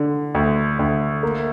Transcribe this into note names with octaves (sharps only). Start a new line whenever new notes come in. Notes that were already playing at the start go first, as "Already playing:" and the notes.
Already playing: D3
D2
D2
A#3